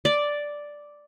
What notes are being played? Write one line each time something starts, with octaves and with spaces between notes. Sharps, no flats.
D5